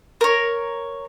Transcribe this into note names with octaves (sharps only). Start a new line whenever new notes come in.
A#4 C#5